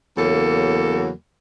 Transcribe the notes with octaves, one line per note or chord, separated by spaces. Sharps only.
E2 C#3 F#3 A#3 A4